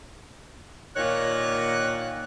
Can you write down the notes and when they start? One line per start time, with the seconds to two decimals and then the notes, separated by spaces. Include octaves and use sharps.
0.96 A#2 D#3 C#5 F#6